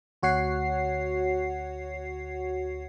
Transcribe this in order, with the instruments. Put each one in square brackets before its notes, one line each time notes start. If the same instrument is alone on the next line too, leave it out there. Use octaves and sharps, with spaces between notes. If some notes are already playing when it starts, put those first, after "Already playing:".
[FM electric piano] D2 F#4 C#5 F#5 C7